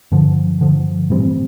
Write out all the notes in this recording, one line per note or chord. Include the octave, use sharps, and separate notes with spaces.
G2 D3 F3
G2 D3 F3
A2 E3 G3 C4